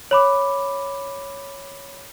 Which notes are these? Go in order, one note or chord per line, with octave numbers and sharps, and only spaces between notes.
C#5 B5 D6